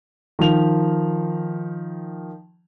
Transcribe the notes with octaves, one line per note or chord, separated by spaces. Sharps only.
D#3 F3 F7